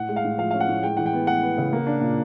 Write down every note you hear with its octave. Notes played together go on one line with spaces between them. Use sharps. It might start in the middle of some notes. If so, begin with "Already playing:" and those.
Already playing: A2 F#5
G#3
F5
A2
F3 F5
C#4 F5
F#5
A2
G#3 G5
E3 F#5
G5
B3
B3 F#5
B3
C#3
A#3
D4
A#2